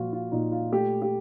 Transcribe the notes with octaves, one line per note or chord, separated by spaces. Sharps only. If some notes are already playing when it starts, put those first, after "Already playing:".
Already playing: A#2 F3 F4 F#4
F4
A#2 D#4
F4
A3 G4
G4